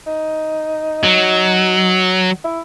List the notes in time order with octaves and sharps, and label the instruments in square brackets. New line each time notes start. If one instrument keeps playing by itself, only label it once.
[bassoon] D#4
[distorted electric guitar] F#3
[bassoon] E4